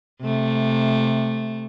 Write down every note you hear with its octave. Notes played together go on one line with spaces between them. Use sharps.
C3 A3